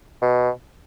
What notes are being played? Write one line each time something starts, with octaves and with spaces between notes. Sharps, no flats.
B2